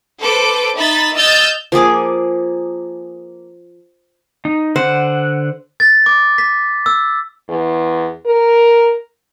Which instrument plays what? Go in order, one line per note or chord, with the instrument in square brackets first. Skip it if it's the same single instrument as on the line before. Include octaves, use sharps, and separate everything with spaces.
[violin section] A4 B4 C5 D6
D#4 E5 B5 A6 B6
D#5 E6 F6 G6 A6
[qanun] F3 A#3 G#4 D6
[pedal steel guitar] D#4
[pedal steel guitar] D3 F#5 [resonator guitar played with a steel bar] C5
[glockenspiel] A6
D6
B6
E6
[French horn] E2
A#4